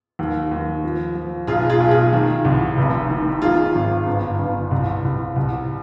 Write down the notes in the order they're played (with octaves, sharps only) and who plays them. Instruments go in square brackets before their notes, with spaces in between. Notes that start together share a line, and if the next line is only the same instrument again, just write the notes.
[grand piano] D#2
D#2
F3
F3
B1 F4 G#4
F4 G#4
B1
F4 G#4
D#3
C2
F1
D#3
D#3 F4 G#4
G#1
G1
G1
C2
C2
C2